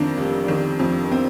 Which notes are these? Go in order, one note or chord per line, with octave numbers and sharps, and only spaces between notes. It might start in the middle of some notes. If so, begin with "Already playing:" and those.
Already playing: F2 D#3 A#3 C4 D4
F1
D#3
F2
C4